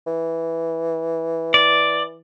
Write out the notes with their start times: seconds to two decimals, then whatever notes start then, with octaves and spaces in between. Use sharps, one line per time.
0.07 E3
1.54 D5